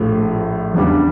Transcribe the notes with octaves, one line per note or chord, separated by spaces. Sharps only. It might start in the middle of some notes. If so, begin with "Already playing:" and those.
Already playing: A#1 A2 F3 A3
E2 C#3 G3 D4